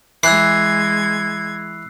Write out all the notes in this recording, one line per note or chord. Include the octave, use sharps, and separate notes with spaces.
E3 G#3 E6 F#6 G#6 C7